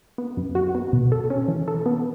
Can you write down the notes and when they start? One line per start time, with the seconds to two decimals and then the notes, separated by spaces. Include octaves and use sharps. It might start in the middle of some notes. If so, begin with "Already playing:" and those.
0.18 B3
0.37 F#2
0.55 F#4
0.75 B3
0.93 B2
1.12 A4
1.30 C#4
1.48 E3
1.68 A4
1.86 B3